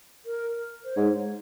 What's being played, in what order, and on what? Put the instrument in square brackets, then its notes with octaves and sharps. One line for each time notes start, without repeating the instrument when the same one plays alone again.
[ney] A#4
C5
[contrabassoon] G#2 [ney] C#5